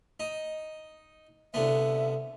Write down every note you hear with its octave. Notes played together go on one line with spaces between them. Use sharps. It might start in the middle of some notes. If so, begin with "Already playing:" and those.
D#4
C2 D3 B3 E5